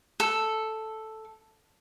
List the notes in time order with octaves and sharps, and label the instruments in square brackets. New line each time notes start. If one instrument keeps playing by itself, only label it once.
[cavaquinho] A4